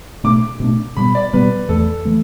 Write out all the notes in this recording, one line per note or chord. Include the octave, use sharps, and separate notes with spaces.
B2 A3 D4 D6
B2 A3 D4
B2 G3 B3 B5
D5
B2 G3 B3 B4
E2 E3 A3 A4
E3 A3